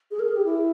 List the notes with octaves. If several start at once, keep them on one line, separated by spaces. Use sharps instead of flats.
G#4
A#4
G#4
G4
E4